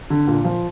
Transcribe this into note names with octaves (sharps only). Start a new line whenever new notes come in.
D3
A#2
F3